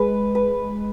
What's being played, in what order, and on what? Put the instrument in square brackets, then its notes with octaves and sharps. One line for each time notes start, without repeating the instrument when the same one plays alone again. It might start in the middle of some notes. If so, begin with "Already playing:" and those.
Already playing: [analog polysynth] G#3 [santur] B4
[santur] B4